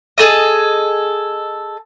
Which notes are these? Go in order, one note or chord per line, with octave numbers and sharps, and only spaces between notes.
G#4 A4 D#5